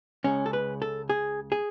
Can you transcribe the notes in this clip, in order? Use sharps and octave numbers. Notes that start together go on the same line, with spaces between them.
C#2 C#3 G#3 C#4
A4
B4
A4
G#4
G#4